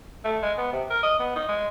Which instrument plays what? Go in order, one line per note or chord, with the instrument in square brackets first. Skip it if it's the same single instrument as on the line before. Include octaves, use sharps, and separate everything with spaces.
[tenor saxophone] A3
G#3
B3
C3
A#4
D#5
B3
D#4
G#3